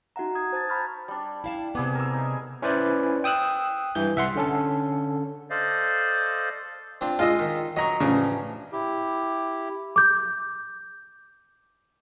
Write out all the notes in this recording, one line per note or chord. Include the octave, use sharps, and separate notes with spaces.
D#4 F#4 E5 F#5 A#5
D#6 G#6
C5 A5 G#6 A6
A#5 B5 C#6 F6 G6 A6
G3 D4
E4 F5 A5
C3 G3 B3 G#4 D6
A#4 E6
D#4 E5
C#4 E4 B4 C5 D5 G#5
G5 D#6 E6 F#6
G2 E3 G6
C2 E5 F#5 C6
D3 C#4 A4
A4 C5 D5 D#5 F5
C4 D4 F4
G#3 F4 D#5 E6
D#3
F#3 D#5 A#5 C#6
A1 C#3 F3 D4
E4 G4
D6 G6